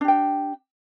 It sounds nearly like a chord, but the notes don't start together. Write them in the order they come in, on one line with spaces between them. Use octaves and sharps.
D4 G4 G5